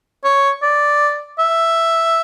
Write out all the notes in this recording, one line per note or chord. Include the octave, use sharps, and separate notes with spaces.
C#5
D5
E5